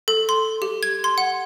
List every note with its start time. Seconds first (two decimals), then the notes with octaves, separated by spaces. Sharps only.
0.08 A4
0.29 C6
0.62 G4
0.83 G#6
1.04 C6
1.18 F#5